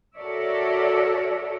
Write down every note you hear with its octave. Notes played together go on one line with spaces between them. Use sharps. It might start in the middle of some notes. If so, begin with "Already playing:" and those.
F#4 A4 A#4 C#5 D5 E5